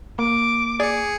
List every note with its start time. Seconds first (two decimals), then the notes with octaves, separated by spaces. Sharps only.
0.19 A#3 D6
0.80 G#4 D5 C#7